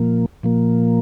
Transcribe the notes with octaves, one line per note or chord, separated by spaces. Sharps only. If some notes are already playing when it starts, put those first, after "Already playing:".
Already playing: A#2 F3 A#3
A#2 F3 A#3